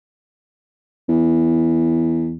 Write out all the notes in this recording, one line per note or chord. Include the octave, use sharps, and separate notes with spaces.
E2